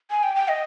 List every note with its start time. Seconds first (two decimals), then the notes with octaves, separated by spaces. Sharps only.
0.11 G#5
0.23 G5
0.36 G5
0.48 D#5